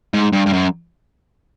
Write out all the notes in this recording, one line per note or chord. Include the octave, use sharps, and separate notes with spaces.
G#2
G2
G2
F#2